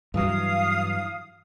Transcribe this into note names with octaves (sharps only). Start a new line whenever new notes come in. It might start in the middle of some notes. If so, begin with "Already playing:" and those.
G2 E3 F#3 F5 D#6